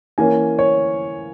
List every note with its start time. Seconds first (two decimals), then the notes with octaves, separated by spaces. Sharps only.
0.18 E3 A#3 C#4 G#5
0.59 C#5